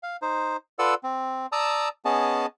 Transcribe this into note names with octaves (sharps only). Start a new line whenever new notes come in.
F5
D#4 C5
F4 A4 B4 D5 F#5 E6
C4
D5 A5 A#5 D#6 E6
B3 C#4 G#4 D#5 A5